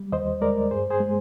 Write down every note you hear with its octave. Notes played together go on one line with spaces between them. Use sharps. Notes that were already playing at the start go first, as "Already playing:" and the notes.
Already playing: G3
D#2 C5 D#5
G#3 A#4 D5
G2 G#4 C5
G#4 C5
G#3